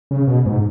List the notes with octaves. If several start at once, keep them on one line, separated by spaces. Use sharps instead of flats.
C#3
B2
G#2